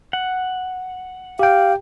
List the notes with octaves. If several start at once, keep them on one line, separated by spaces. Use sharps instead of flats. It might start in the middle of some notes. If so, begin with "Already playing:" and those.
F#5
G4 F5 G5